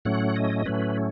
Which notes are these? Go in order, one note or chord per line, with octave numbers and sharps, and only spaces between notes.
A2 F#3 A3 C#4 F#5
D#5
A2 F#3 A3 C#4 B4